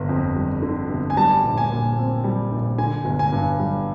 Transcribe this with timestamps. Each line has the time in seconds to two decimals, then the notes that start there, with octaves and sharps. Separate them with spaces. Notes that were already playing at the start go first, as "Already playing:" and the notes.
Already playing: G1 D3
0.09 F2
0.36 G3
0.62 D3
0.90 G1
1.10 G#5
1.17 G3 A5
1.43 A#1
1.58 G#5
1.71 A#2
1.98 C4
2.24 G3
2.52 A#1
2.78 D3 G#5
3.05 G1
3.19 G#5
3.32 G2
3.59 G3